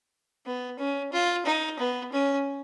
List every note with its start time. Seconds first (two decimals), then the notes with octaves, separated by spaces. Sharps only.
0.46 B3
0.79 C#4
1.12 F4
1.45 D#4
1.79 B3
2.12 C#4